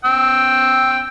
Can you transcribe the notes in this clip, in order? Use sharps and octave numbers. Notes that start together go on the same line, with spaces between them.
G5 E6